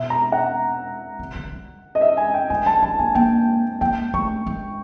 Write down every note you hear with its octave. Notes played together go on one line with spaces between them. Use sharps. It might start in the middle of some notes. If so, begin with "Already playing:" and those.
Already playing: B2 E5
A#5
F#5
C3
C#3
G3
D#5
E5
G#5
G5
A3 G#5
G#3 A5
G#3 A5
A#3 G#5
A#3 G5
A#3 G5
A3 C#6
G#3